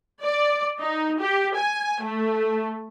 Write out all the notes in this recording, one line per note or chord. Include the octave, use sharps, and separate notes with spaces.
D5
D#4
G4
G#5
A3